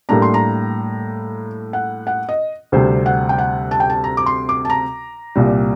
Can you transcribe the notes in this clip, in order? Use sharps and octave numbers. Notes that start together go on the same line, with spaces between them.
A2 G3 A#3 D4 A#5
C6
A#5
F#5
F#5
D#5
D2 C3 G3 C4 C5
F#5
G5
F#5
A5
G5
A5
A#5
D6
C6
D6
A5
A#5
C2 A#2 G3